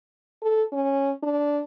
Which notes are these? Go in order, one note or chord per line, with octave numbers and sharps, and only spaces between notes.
A4
C#4
D4